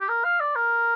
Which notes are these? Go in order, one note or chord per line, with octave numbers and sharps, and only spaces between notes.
G4
A#4
F5
D5
A#4